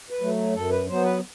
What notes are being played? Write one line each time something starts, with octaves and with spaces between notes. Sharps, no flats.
B4
F#3 A3
F#2 A4
B4
F#3 B3 C5
B4